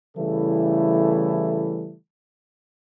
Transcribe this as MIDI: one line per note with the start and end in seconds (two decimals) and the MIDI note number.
0.17 1.95 49
0.17 1.95 52
0.17 1.95 55
0.17 1.95 57
0.17 1.95 64
0.17 1.95 69